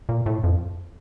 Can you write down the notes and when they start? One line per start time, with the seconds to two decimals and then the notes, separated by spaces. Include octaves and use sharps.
0.09 A#2
0.26 A2
0.44 F2